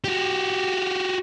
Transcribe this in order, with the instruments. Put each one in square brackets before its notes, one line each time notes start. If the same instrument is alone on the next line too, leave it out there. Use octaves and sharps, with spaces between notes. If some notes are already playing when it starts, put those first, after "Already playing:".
[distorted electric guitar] F#4 G4